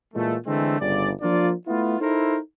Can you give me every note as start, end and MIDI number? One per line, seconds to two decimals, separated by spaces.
0.14 0.36 46
0.14 0.36 52
0.14 0.36 56
0.14 0.36 57
0.47 0.79 50
0.47 0.79 52
0.47 0.79 56
0.47 0.79 57
0.47 0.79 60
0.80 1.10 31
0.80 1.10 49
0.80 1.10 55
0.80 1.10 74
1.22 1.52 53
1.22 1.52 58
1.22 1.52 62
1.22 1.52 65
1.22 1.52 74
1.67 1.96 57
1.67 1.96 59
1.67 1.96 64
1.67 1.96 65
2.01 2.38 63
2.01 2.38 64
2.01 2.38 69
2.01 2.38 70
2.01 2.38 72